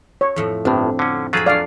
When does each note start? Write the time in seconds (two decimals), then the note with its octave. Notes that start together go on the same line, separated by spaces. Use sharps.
0.21 C#5
0.36 F2 A2 F3
0.65 G1 A2 C4 D4
0.99 D3 C#4
1.33 F2 F#3 F4 G#4 E5 B5
1.46 D4 D5 F5 A#5